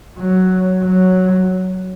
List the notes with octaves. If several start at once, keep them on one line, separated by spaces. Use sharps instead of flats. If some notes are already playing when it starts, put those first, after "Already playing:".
F#3
F#3